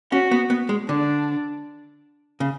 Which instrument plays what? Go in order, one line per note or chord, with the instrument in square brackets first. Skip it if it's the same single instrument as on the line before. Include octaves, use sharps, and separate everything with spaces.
[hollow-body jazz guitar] C#4 [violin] F#4
[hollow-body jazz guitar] B3
B3
G#3
[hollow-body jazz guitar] D3 [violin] D4
[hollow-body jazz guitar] C#3